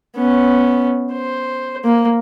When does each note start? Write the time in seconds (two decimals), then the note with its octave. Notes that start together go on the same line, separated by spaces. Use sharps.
0.16 B3 C#4
1.13 C5
1.84 A#3